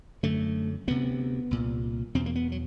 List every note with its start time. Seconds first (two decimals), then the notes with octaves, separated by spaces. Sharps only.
0.23 F#2 D3 A3
0.87 D2 C3 B3
1.51 C2 A#2
2.15 E2 B2 C4
2.26 A#3
2.36 B3
2.52 F#3